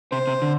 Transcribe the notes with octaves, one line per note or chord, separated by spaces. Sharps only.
C3 C5
C3
D3